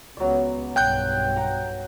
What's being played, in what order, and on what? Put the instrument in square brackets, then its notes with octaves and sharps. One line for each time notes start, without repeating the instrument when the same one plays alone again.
[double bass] C#2 B3 [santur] F#3 D5
[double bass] B1 G2 [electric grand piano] G5 F#6 G6
[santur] F#5 A#5